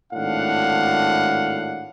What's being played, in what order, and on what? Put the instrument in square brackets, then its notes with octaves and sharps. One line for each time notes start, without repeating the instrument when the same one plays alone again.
[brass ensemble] G#1 A2 D4 F5 F#5